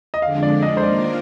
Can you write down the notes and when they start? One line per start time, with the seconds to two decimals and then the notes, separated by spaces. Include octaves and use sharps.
0.14 D#5
0.22 F2 D3 G#3 D4 F5
0.43 D5
0.63 D#5
0.77 C5
0.83 D#3 A#3 D4 F4 A#4 D5